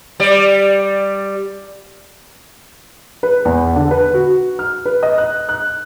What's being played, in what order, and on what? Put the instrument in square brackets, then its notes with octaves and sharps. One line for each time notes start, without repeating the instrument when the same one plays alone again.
[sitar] G3 D5
[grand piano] B4
E2
D3
B4
F#4
F6
B4
D#5
F#6
F#6